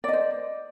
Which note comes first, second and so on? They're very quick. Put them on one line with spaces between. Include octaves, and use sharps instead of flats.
D5 D#5 C5